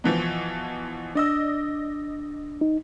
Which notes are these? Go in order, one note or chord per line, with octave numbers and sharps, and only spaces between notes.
B2 E3 F3
D4 D5 D#5 E6
D#4